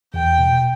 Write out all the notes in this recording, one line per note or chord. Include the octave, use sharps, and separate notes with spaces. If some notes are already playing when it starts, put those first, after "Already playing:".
E2 G5
B2